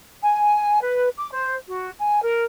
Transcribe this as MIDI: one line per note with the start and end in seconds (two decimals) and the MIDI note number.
0.23 0.82 80
0.83 1.08 71
1.17 1.30 86
1.31 1.54 72
1.68 1.90 66
1.99 2.19 80
2.22 2.43 70